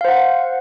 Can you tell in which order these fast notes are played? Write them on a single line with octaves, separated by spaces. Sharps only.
F5 C5 F#5